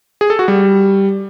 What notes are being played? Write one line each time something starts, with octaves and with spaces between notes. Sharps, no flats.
G#4
A4
F#4
G3